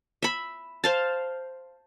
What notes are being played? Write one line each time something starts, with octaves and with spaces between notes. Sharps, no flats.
E5 B5
C5 F5 A5